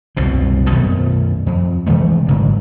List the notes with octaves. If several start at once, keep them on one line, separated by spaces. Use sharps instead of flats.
C2 F#2 B2
F#2 B2 D#3 A3
F2
C3 E3 G#3 A3
F#1 G#2 D3